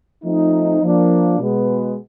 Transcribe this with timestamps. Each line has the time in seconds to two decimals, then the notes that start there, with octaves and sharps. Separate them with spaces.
0.24 F3 A3 C4 D#4
0.81 F3 A#3 D4
1.39 B2 G#3 B3